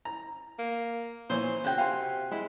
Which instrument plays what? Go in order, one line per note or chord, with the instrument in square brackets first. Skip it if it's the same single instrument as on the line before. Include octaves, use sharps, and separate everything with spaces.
[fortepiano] A#5
[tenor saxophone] A#3
[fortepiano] A#2 E3 C#5 [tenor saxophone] C5
[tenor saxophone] C#3 [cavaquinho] F#4 G5
[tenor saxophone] C3 [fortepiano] F5 G#5 C6
[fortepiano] G#3 [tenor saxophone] E4